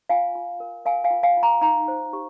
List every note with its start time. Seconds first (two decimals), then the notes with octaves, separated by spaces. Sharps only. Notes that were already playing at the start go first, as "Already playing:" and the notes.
0.09 F4 F5 G#5
0.35 F4
0.60 A#4
0.85 A#4 F5 G#5
1.04 F5 G#5
1.11 F4
1.23 F5 G#5
1.37 F4
1.43 G5 A#5
1.61 D#4 G5 A#5
1.88 C5
2.13 G4